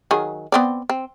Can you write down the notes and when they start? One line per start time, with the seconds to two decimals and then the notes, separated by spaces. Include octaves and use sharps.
0.11 D#3 F#3 G#4
0.52 B3 C4 D5
0.89 C4